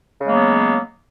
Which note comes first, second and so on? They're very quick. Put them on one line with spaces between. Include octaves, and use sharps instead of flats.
C#3 G#3 A#3 F#3 B3